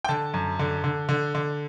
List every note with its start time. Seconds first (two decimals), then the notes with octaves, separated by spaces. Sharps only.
0.04 G5
0.09 D3 A5
0.34 F#2
0.59 D3
0.84 D3
1.09 D3
1.35 D3